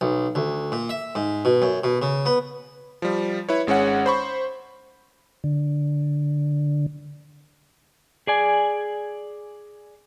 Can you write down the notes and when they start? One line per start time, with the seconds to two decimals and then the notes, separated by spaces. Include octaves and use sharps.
0.01 B1
0.35 D2
0.72 A#2
0.89 E5
1.15 G#2
1.45 B2
1.62 F#2
1.84 B2
2.02 C#3
2.26 B3
3.02 F3 G3
3.49 E4 B4 C#5
3.67 G#1 G#3 C#4 C#5 F#5
4.06 C5 B5 C#6
5.44 D3
8.27 G#4 D5 G#5